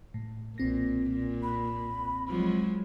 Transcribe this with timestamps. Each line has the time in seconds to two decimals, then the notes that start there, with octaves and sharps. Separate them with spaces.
0.14 A2
0.58 B1 A#2 C4 A#6
1.11 A#2
1.43 B5
2.28 F3 F#3 G#3